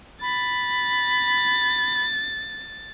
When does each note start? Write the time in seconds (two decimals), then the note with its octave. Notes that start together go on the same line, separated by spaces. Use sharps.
0.22 B5 A6